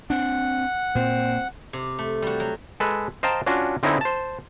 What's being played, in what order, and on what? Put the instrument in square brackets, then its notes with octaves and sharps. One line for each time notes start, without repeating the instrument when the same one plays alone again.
[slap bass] C4 D4 [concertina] F#5
[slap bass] A#2 [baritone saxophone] C4
[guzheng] C3
A3
G3 F#4
F#3
[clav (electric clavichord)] G#3 A4 B4
C5 D#5 F5 G5 A5 A#5
C#4 D4 F4 F#4
D3 C4 C#4 D#4 E4
C5 A5